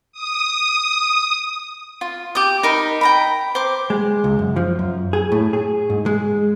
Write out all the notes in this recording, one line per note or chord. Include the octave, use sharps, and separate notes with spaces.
D#6
F4
G4 D#6
D#4 A#4 B5
G5 A#5 B5
C5 D6
G#3
C#2
F#2
F3
F#2
G#4
A2
G#4
G#2
G#3